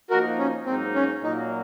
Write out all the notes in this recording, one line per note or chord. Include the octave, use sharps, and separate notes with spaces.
F3 A#3 D#4 F#4 A#4
C#4
G#2 F#3 A#3 C4 D#4
C#4
A#2 F#3 A#3 D#4